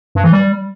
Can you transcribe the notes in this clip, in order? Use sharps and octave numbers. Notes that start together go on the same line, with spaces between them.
G2
E3
G3